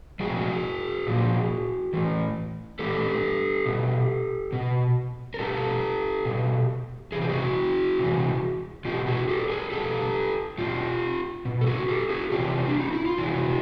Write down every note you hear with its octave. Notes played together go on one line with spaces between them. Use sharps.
A#2 F3 F#4 G#4
A#2 F3
A2 E3
A2 E3 G4 A4
B2
B2
A#4
B2 G4 A4
B2
C3 E3 G#4
G4
F#4 G#4
C3 E3
B2 F4 G4
F#4 G#4
G4 A4
G#4 A#4
B2 G4 A4
B2 F4 G4
B2
A4
F#4 G#4
G4 A4
F#4 G#4
C3 E3 F4 G4
D4
D#4
E4
F4
C3 E3 E4 F#4